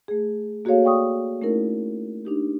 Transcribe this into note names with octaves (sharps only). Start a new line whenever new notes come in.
A3 G#4
A#3 F#4 G#4 A4 C#5 F5
D5 F5 G5 C#6 D#6
A3 C#4 D#4 E4 A#4
D4 D#4 G4